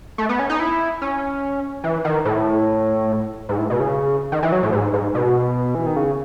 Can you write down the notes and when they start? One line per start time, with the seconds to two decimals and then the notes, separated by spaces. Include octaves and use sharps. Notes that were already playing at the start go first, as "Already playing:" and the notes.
0.18 A3
0.29 B3
0.39 C#4
0.50 D#4
0.60 E4
1.02 C#4
1.84 E3
2.04 D#3
2.25 A2
3.49 G#2
3.59 A2
3.70 B2
3.80 C#3
4.32 D#3
4.42 E3
4.52 F#3
4.63 A2
4.72 G#2
4.93 G#2
5.15 B2
5.75 E3
5.86 D#3
5.96 C#3